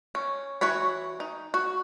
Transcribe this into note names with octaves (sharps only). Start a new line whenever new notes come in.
C#4
E3 F#4 C#5 B5
D#4
F#4